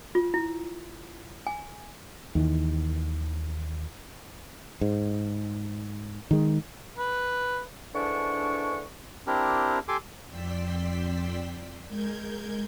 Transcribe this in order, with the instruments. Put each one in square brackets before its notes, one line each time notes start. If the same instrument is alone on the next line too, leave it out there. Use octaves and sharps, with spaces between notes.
[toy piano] F4
E4
G#5
[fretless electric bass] D#2 D#3 E3
G#2
D#3 G#3
[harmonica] B4
[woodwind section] G#2 D3 E3 D4 C#6
[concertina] C4 D4 E4 G4 A#4
G4 A4 G#5 C6 D6
[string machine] F2 D5 G5 C6 E6 B6
G#3 A#4 G6 G#6